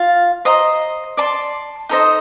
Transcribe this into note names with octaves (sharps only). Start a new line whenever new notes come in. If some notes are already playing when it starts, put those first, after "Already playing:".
Already playing: F4 F5
C5 D#5 A#5
D5 A5 C6
D#4 A4 C5 D#5